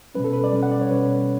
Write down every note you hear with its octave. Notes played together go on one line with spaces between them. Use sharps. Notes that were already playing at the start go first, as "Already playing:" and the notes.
B2 G3 C#4 B4
A4
B4
D5
B2 G3 C#4
F#5
D5
C#5
B2 G3 C#4 B4